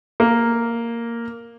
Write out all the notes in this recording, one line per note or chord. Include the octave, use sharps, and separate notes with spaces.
A#3